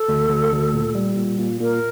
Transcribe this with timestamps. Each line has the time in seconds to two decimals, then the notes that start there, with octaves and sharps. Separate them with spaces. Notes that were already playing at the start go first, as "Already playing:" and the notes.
Already playing: A4
0.09 D2
0.30 D2
0.52 D2
0.74 A#2
0.95 G3
1.16 A#2
1.39 A#2
1.60 A#2 A#4